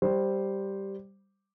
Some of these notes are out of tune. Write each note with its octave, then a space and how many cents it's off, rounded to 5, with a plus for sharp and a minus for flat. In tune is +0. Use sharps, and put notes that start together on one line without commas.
G3 +0 C5 +0